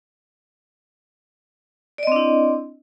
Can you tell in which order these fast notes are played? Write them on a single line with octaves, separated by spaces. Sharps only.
D5 D#5 C4 D4 E4